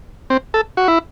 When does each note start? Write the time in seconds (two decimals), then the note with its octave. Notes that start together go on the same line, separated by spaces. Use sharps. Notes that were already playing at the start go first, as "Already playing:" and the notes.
0.30 C4
0.54 A4
0.77 F#4
0.88 E4